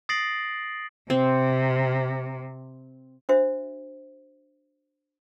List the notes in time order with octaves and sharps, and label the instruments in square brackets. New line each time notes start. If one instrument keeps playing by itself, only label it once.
[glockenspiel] D#6 A6 A#6 C7 D7 F#7
[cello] C3 [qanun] C4
[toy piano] D4 F#4 C5 E5